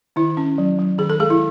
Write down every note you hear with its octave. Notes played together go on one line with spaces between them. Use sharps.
D#3 E4
C#4
F#3
F#3
D#3 G#4
A4
G#3 G#4
E4